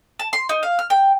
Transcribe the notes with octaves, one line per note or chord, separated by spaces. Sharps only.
A5
C6
D#4
F5
F6
G5